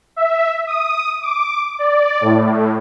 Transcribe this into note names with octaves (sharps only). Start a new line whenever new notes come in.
E5
D#6
D6
D5
A2